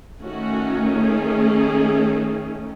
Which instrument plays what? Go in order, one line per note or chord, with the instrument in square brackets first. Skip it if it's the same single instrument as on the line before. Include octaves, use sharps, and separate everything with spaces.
[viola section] D#3 A3 C#4 F#4
G#4